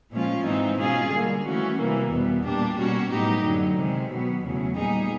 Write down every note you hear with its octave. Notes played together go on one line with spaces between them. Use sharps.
A#2 F3 G#3 C#4 F4
G#2 E3 G#3 C4 D#4
B2 G#3 C#4 F4 G#4
D3 G3 A#3
E3 A3 C#4 F#4
C3 E3 G3 A#3
E2 B2 G3 B3
A#2 G3 A#3 D4 G4
B2 G3 A#3 C#4 F#4
A2 F#3 B3 D#4 G4
F#2 D3 F#3
C3 D#3 G#3
B2 F#3 B3
E2 C#3 F#3 A3
A#2 G3 B3 D#4 G#4